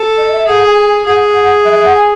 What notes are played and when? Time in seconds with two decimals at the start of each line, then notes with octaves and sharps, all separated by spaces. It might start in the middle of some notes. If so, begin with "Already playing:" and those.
Already playing: A4
0.17 D#5
0.32 E5
0.47 G#4 F#5
0.61 G#5
1.06 G#4 F#5
1.64 E5
1.74 E5
1.84 F#5
1.94 G#5